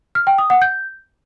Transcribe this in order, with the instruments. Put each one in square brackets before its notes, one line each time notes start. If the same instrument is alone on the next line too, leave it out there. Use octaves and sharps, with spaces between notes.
[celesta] F6
G5
D#6
F#5
G6